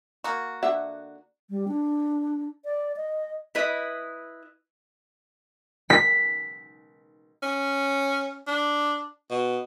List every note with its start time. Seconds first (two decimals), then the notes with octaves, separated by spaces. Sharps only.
0.24 A#3 F#4
0.62 D3 E5 F#5
1.50 G3
1.68 D4
2.65 D5
2.97 D#5
3.55 E4 B4 D#5
5.90 B6
7.43 C#4
8.47 D4
9.31 B2